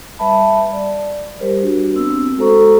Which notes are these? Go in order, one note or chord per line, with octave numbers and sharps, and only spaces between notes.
G3 B4 E5 A5 B5
D5
G3 G4 A#4 C5
D4 F#4
B3 C4 D4 E6
G#3 F#4 A4 C5 A#5 C#6